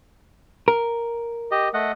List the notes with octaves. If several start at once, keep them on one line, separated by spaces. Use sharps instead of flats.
A#4
G4 D#5
A3 D#5 F#5